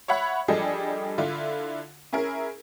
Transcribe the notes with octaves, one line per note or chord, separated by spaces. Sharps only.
C#5 E5 F#5 B5
F3 G3 D4 G#4 A4 D#5
D3 E4 F4
C#4 E4 G#4 A#4